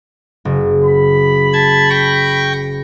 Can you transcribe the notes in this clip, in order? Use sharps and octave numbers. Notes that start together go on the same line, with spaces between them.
F#1
B5
A5 G#6
G5 C#6 A#6